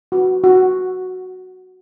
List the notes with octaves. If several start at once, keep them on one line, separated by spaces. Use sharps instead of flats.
F#4
F#4